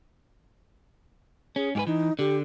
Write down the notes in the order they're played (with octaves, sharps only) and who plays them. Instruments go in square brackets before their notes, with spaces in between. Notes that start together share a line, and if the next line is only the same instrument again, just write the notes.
[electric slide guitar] C#4 [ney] G#4
[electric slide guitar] G#2 G4 B4 [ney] G#5
[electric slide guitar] E3 [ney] D#4
[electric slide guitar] D3 [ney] G4